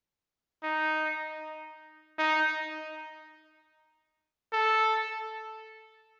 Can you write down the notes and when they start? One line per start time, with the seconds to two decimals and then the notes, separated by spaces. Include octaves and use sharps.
0.64 D#4
2.19 D#4
4.53 A4